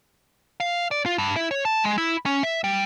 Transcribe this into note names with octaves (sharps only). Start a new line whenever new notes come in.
F5
D5
F4
G2
E4
C#5
A5
G#3
E4
C#4
E5
G3